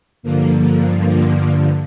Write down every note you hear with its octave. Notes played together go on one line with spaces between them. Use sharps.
G2 D3 F3 A#3
A#3
A#3